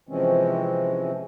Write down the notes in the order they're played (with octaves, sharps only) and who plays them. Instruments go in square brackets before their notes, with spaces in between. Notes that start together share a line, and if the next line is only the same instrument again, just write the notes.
[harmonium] C3 E3 F3 G#3 C4 C#4